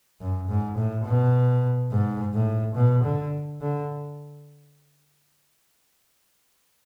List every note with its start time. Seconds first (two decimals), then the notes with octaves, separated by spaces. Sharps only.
0.21 F#2
0.49 G#2
0.77 A2
1.06 B2
1.91 G#2
2.34 A2
2.75 B2
3.04 D3
3.61 D3